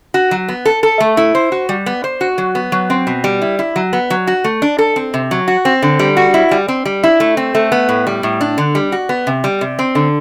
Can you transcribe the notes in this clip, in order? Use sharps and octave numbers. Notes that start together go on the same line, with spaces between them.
F#4
F#3
B3
A4
A4
A3
E4
C5
F#4
G3
B3
C5
F#4
F#3
B3
F#3
C4
B2
G3
E4
E4
F#3
B3
F#3
F#4
A3
D4
A4
C4
C3
F#3
F#4
C4
D3
G3
F#4
E4
G3
C4
G3
E4
A3
C4
A3
B3
A2
G3
A2
D4
D3
G3
F#4
B3
C3
G3
C3
C4
D3